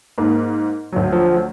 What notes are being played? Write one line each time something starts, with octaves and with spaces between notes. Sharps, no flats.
G#2 A#3
D2 F#3
F3